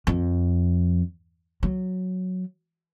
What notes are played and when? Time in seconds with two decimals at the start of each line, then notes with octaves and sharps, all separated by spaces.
0.07 F2
1.63 F#3